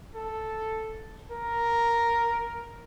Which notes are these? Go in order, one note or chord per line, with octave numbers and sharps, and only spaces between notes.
A4
A#4